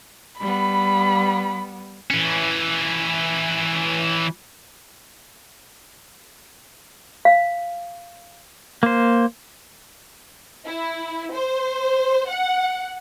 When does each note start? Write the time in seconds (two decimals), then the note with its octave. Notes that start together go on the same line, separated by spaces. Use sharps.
0.40 G3 B3 B5
2.11 E3 C#4
7.25 F5
8.83 A#3 C5
10.67 E4
11.33 C5
12.30 F#5